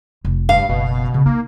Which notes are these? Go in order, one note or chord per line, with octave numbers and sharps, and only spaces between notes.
F1
G2 F5
F#1 B2
C#3
A#3 D#4